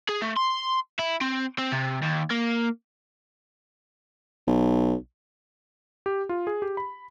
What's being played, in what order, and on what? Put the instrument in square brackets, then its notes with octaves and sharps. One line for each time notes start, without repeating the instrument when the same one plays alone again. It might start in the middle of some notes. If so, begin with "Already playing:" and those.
[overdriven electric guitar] G#4
A3
C6
E4
C4
C4
C3
D#2
A#3
[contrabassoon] B1
[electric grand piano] G4
F4
G#4
G4
B5